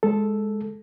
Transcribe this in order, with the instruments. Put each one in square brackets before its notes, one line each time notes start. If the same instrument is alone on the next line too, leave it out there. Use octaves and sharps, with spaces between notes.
[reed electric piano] G#3 A4